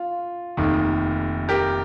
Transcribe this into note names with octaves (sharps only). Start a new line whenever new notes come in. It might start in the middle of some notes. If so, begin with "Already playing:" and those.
Already playing: F4
F1 D#2 D#3
G4 A#4